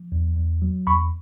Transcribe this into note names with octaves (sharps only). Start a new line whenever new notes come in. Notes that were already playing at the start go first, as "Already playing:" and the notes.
Already playing: F3
E2
E2
F#3
E2 B5 C#6